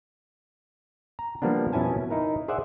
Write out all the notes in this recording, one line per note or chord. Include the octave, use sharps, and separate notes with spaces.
A#5
F3 G3 A#3 B3 D4
F2 B2 C#4 E4 G#5 A5
D#4 E4 A#4
G#4 C5 D5 E5 F#5